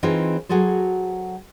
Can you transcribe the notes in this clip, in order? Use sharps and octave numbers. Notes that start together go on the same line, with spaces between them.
E3 C4 D#4 F4 G#4
F#3 F#4 G#4 A4 C5